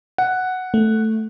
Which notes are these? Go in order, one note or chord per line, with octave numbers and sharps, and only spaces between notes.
F#5
A3